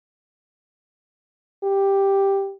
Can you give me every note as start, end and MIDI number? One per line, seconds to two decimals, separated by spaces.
1.64 2.54 67